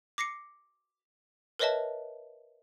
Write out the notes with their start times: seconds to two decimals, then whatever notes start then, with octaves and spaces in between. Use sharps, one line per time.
0.18 D6 A#6 C7 C#7
1.59 A#4 B4 C#5 D#5 E5 A5